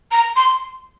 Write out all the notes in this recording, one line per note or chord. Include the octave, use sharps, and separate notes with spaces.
A#5
C6